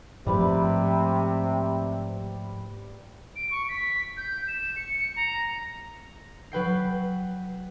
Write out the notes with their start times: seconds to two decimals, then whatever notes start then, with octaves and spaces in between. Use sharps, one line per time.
0.27 G#2 C3 F3 G3 A3 B4
3.36 D7
3.51 C#6
3.69 B6
4.17 G6
4.48 E7
4.76 C#7
5.16 A#5
6.52 F#3 B4 G5 C7